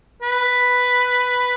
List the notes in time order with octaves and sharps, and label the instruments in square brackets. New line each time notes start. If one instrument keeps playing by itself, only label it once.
[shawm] B4